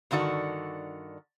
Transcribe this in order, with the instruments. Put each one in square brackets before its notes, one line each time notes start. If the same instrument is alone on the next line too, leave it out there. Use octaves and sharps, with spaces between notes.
[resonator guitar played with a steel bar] G2 D3 D#3 F#4 D5